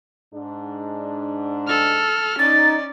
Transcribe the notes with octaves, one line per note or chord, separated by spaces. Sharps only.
G#2 D4
A4 F6
C#4 D#4 D5 A6